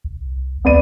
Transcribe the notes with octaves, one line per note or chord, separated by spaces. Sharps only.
C2
D2 B3 D5 D#7